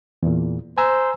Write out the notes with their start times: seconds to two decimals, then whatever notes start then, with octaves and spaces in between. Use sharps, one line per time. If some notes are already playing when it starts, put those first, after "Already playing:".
0.23 E2 A#2
0.78 C5 G#5 A#5 E6